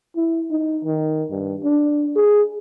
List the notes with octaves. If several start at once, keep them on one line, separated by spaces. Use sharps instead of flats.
E4
D#4
D#3
G2
D4
G#4